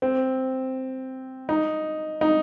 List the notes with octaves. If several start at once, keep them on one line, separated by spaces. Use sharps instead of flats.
C4
D#4
D#4